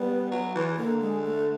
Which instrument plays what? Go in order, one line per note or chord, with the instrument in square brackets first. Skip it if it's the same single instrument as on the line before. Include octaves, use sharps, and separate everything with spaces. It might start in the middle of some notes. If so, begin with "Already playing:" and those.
Already playing: [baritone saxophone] G3 [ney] B3
[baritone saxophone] F#3
E3
[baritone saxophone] D3 [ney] A#3
[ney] G#3
A3